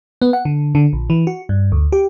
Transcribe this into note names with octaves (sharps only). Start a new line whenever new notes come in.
B3
F#5
D3
D3
A#1
E3
F#4
G2
D2
G4